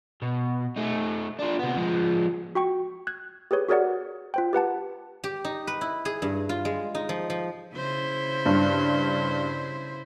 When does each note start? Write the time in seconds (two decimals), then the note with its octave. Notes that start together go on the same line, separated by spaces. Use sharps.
0.22 B2
0.77 A3 D#4
1.39 D4 F4
1.59 C3 B3
1.77 F3 G#3
2.55 F#4 G5 C#6
3.07 F#6 G#6
3.51 G4 G#4 B4 C#5
3.69 F#4 G#4 A#4 C#5 D5 F#5
4.34 F4 C5 G5
4.53 G4 B4 F#5 A5
5.24 G4
5.45 D#4
5.67 B4
5.81 E4
6.05 G#4
6.22 G2
6.49 F4
6.65 G#3
6.95 D#4
7.09 F3
7.30 F3
7.75 C#3 E4 C5
8.46 G2